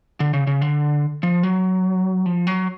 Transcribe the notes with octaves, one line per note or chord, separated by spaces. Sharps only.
D3
C#3
C#3
D3
F3
F#3
F3
F#3